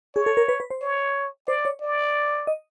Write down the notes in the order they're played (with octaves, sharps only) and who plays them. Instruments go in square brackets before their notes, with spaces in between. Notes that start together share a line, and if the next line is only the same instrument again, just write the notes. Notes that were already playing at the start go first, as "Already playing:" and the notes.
[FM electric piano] G#4 [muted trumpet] C#5
[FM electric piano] A4
A#4
B4
B4
C5
[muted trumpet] C#5
[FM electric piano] C5 [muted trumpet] D5
[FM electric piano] C#5
[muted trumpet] D5
[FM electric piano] D#5